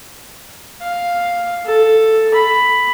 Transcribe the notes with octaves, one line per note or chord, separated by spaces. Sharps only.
F5
A4
B5